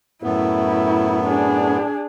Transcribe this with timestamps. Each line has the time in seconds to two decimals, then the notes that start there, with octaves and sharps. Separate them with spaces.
0.23 F#2 A2 B3 E4
1.27 D4 G#4